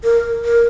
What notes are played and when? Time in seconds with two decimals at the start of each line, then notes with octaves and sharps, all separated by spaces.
0.04 A#4
0.45 A#4